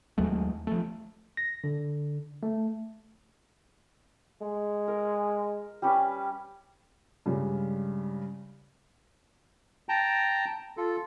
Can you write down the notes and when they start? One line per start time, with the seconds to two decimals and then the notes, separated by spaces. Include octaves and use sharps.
0.18 D#2 F#3 G#3 A3
0.67 F3 A3
1.37 A#6
1.64 D3
2.43 A3
4.42 G#3
4.88 A#4
5.82 G3 C#4 B4
7.26 G2 C#3 G3 G#3
9.89 G5 A5 A#5
10.77 F4 A4